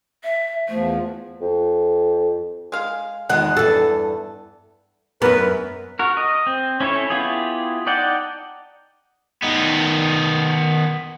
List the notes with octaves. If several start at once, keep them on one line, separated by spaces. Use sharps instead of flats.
E5
E2 F3 A3
F2
G#3 F5
E2 D#3 G#3 F#5
E2 G2 A4
F#2 B3 A#4 B4
F#4 A#4
D#5
C4
C#4 E4 A4 C#5
B3 E4 F4 G4 G#4
D#4 D5 F#5 G5 A5
D#3 B3